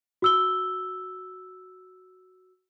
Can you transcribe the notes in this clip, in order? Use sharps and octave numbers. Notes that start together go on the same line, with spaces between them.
F#4 E6 G7